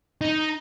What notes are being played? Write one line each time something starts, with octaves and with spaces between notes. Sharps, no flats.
D#4